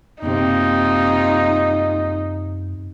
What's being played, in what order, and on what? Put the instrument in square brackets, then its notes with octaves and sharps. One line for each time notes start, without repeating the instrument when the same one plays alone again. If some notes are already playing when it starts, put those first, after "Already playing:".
[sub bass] F#2 [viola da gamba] C3 A#3 F4 [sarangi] D#4